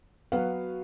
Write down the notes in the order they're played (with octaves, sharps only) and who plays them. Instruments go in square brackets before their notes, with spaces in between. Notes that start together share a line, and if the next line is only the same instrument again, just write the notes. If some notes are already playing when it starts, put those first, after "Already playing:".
[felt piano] F#3 B3 F#4 B4 F5